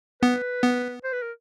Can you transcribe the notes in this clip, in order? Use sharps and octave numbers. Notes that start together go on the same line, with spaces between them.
B3 B4
B3
C5
B4
A#4